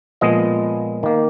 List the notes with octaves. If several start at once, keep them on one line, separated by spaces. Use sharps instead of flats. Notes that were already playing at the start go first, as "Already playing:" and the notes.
A#2 F3 G#3 B3 D#5
D#3 A#3